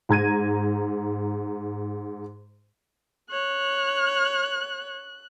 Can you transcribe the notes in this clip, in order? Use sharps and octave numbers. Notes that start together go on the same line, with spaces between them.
G#2 A#5 G#6 D#7
C#5 F#6